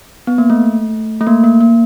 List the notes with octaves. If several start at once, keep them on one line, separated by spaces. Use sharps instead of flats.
B3
A#3
A3
A3
A#3
A#3
A#3